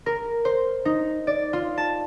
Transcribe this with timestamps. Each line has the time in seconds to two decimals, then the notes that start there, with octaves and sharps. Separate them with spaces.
0.06 A#4
0.45 C5
0.85 D#4
1.27 D5
1.53 F4
1.78 A5